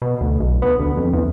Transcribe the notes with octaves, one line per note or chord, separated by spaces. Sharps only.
B2
D2
B1
B3
D2
F2
E2